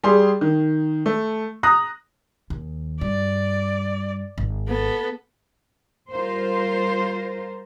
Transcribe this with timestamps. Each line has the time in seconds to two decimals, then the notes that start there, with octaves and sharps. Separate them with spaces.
0.04 G3 G#4 C6
0.41 D#3
1.06 A3
1.63 A#5 D#6 F#6 A#6
2.50 D#2
3.01 G2 D5
4.38 G#1
4.68 B3 A4
6.11 G3 F4 A#4 C5